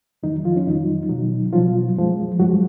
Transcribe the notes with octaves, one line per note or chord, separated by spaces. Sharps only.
F2 D#3 F#3 D#4
F3 F4
C#4
F2 D#3 F#3 D#4
B2 F#3
B2 F3 F#3 F4
F#2 F3 G#3
F#2 F3 F#3 G#3 F#4